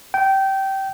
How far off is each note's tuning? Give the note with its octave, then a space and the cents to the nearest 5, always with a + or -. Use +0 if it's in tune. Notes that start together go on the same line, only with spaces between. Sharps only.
G5 -20